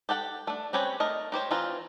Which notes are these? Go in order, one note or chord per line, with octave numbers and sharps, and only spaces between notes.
G4 A4 F#5 G5
A3 D4
C4 C#4 G4 B4 C#5
A3 A#4 D#5
D#4 G4 C5 C#5
E3 C4 F4 A#5